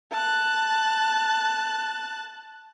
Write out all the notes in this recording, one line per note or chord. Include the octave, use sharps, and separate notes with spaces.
A5 F#6